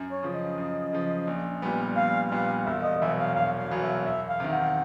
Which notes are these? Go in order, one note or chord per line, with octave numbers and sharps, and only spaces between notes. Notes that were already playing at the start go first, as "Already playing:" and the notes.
Already playing: F#2
C#5
C#3 F3
D#5
F#2
C#3 F3
A#1
A#2 G3 B3
A#1 F5
A#2 G3 B3 F5
E1 E5
D#5
E2 B2 F#3 E5
F5
E1 F5
F5
E2 B2 F#3
E5
E2 E5
F5
C3 D#3
F#5